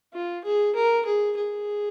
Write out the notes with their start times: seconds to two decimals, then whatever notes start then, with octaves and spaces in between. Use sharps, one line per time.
0.14 F4
0.45 G#4
0.75 A#4
1.06 G#4
1.37 G#4